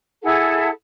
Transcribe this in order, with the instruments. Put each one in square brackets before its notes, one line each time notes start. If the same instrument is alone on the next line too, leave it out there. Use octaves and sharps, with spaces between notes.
[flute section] E4 G#4 A4 F#5